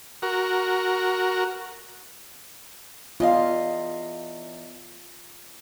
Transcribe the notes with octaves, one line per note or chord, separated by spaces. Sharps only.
F#4 A#4
E2 F4 D#5 F5